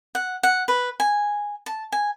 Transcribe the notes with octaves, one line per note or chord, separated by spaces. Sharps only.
F#5
F#5
B4
G#5
A5
G#5